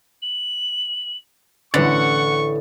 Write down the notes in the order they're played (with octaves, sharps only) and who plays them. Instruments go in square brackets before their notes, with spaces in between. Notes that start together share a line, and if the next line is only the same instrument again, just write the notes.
[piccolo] F#7
[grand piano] A1 B4 A6 [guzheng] D3 [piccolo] F#5 [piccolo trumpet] C#6